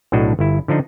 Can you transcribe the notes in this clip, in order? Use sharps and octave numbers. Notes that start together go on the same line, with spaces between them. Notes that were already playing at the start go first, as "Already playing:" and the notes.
B1 A2 D4 F#4 D#5
G1 E4
D3 F3 D4 D#4